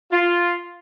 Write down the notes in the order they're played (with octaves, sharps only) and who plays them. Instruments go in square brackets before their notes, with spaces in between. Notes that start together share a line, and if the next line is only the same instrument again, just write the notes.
[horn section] F4